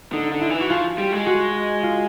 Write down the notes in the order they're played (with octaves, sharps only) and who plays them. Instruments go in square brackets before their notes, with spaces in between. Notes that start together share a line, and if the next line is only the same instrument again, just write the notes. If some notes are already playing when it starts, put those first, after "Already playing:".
[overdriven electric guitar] D3 [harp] D#4
[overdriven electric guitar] D3
[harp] E4
[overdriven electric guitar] E3
[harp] F#4
[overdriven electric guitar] F3 [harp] F4
[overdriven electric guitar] G3
G#3
[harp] F#4
F4